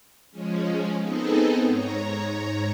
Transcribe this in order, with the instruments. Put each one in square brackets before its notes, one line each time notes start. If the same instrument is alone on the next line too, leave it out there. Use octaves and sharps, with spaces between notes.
[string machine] F3 G#3 C#4
B3 C4 D#4 G#4 A4 D#5
G#2 C#5 A#5